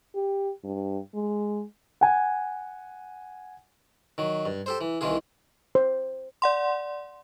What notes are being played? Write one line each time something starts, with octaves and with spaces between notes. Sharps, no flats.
G4
G2
G#3
F#5 G#5
D#3 F#3
G2
G4 A4 C5
E3
C2 D#3 E3 F4 G#4
C5
D5 F#5 C6